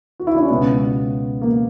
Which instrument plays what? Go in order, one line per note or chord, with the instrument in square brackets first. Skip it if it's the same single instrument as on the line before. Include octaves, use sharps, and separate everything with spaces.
[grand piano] F#4
E4
D4
C#4
C#2 B2 F#3 B3
A#3